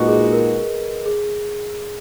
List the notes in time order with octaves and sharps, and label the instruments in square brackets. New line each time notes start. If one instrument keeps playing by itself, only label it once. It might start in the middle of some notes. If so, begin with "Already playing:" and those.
Already playing: [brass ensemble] A#2 G#3 D#4 F#4 [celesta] B4 D#5
[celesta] G#4
A#4
G#4